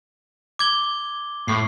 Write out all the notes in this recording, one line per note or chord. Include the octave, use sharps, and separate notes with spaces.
D6 G#6 G7
A2 C7